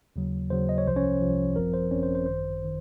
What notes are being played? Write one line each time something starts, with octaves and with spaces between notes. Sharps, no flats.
D#2 C#3 F#3
D#2 C#3 F#3 C5
D#5
C#5
C2 C3 F3 C5
C#4 C#5
C2 C3 F3
G#1 F#2 F3 C4 A#4
C5
G#1 F#2 F3 C4 C#4 C#5
C5
C5
G#1 F#2 D#3 C5
D#3